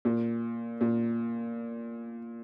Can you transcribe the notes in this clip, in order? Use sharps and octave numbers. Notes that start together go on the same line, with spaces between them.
A#2
A#2